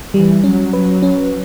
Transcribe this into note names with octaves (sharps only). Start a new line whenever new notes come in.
E3 G3
F#3 C#4
B4
C#4